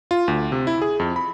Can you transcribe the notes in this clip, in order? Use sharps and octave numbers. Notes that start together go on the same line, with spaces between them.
F4
D2
C3
E4
G#4
F2
B5